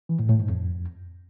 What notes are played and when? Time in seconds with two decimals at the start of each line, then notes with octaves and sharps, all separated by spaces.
0.09 E3
0.19 A2
0.29 A2
0.39 G#2
0.49 F2